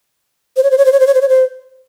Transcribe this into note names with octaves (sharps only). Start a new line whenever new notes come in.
C5
C#5
C5
C#5
C5
C#5
C5
C#5
C5
C#5
C5